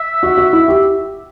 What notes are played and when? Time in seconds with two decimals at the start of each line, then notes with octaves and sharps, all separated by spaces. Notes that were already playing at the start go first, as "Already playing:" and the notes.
Already playing: E5
0.23 F#4
0.37 F#4
0.53 E4
0.68 G4